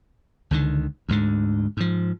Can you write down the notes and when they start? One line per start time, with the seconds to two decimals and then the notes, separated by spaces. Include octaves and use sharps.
0.51 C#2 D3 D#3
1.09 D2 G#2 D3
1.77 G#2 F3